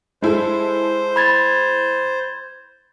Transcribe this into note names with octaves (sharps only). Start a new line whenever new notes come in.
G#3 E4 A4 C5
B5 G#6 A6